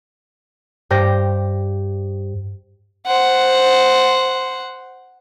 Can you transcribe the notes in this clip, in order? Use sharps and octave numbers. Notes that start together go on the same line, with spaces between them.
G2 G4 C5 G6 A#6
C5 F#5